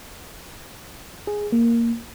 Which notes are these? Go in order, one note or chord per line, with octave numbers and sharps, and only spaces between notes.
G#4
A#3